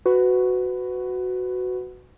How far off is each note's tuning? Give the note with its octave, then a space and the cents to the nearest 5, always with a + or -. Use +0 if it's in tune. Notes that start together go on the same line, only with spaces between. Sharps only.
F#4 +0 B4 +15